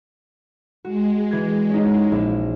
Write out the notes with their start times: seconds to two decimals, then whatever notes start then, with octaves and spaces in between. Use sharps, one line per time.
0.85 G#3 F#4
1.31 E3 G#6
1.70 C#4 D#4
2.12 A#1